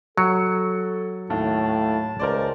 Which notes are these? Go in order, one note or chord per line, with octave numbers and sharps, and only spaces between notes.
F#3 A4 C#7
D#2 A2 A5
C#2 A#4 C5 D5